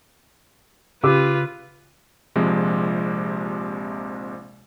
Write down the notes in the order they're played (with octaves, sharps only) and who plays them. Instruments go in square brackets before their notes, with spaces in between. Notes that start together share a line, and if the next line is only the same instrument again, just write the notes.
[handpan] C#3 [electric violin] F4 B4 [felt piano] G4 D6 E6
[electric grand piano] A#1 C3 F3 G#3